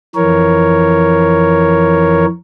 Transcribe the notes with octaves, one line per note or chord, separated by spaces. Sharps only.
F2 E3 A#4 C#5